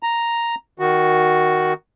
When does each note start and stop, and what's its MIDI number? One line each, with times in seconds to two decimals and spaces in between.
0.03 0.55 82
0.79 1.73 51
0.79 1.73 66